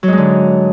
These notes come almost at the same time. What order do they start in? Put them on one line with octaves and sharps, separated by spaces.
F#3 G#2 G#3 D3